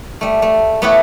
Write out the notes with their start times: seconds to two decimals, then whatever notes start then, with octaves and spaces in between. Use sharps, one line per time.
0.21 G3 A3
0.42 A3
0.82 A3 B3 E4 G4 B4 C#5